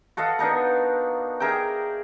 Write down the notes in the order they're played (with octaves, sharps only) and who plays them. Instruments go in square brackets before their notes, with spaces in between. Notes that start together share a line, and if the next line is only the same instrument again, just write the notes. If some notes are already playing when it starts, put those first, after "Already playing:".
[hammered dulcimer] F#4 A4 D#5 F5
B3 D4 D#4 A#4
G#4 A#4 E5 G5